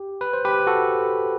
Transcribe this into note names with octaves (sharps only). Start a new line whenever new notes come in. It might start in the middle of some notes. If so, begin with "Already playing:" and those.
Already playing: G4
B4
C5
G4 B4
F#4 A4